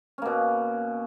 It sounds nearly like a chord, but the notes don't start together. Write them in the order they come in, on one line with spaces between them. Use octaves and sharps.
C#4 A#3 B2